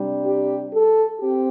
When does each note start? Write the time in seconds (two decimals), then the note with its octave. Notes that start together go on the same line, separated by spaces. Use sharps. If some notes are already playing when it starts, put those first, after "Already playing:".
Already playing: C3 G3 D4
0.24 G4
0.72 A4
1.19 C4 G4